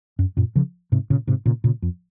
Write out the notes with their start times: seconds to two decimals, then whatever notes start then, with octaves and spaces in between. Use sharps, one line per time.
0.19 F#2
0.37 F#2 A#2
0.56 C#3 F3
0.92 G#2 C3
1.10 A#2 C#3
1.27 G#2 C3
1.46 A#2 C#3
1.64 A#2 C#3
1.82 F2